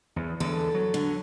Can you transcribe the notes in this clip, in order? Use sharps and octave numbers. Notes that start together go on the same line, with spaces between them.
E2
E2 D3 A4
F#3
D3